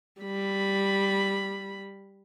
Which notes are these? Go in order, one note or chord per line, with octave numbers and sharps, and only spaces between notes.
G3 B5